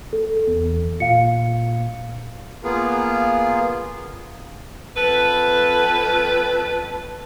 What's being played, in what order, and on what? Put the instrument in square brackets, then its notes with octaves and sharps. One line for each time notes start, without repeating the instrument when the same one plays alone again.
[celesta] A4
[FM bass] E2
[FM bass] A#2 [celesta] F5 C#7
[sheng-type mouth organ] A#3 B3 F4 G#4
[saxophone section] F2 A4 B4